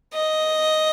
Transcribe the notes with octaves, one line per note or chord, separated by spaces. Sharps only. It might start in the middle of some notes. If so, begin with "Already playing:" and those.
D#5